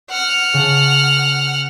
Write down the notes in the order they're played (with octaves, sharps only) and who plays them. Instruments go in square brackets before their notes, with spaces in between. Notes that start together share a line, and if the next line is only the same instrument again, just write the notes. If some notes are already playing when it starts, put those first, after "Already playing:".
[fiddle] F#5 F6
[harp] C#3 A5